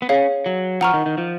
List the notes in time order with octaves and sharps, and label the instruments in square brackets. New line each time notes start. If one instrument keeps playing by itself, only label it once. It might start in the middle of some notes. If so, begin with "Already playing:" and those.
[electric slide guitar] B3
[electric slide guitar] C#4 [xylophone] G#4 C#5 F5
[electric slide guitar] F#3
[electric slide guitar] F3 [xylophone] F#5 A#5 C#6 F6
[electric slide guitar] D#3
D#3
F3